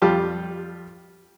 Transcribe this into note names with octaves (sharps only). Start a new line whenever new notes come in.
F2 G3 F4 G4 A5